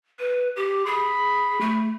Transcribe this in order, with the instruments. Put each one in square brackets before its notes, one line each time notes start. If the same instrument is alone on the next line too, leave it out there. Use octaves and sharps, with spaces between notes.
[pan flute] B4
G4
[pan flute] G#4 [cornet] B5
[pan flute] A3